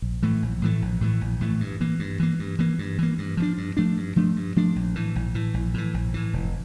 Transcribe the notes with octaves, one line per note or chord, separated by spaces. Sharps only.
A#1
A2 E3 A3
A#1
A2 E3 A3
A#1
A2 E3 A3
A#1
A2 E3 A3
G2
E3 A#3
G2
E3 A#3
G2
E3 A#3
G2
E3 A#3
G2
F3 A3 D4
G2
F3 A3 D4
G2
F3 A3 D4
G2
F3 A3 D4
A#1
A2 E3
A#1
A2 E3
A#1
A2 E3
A#1
A2 E3
F1